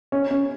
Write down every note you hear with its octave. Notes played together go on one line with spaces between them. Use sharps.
C#4
C#4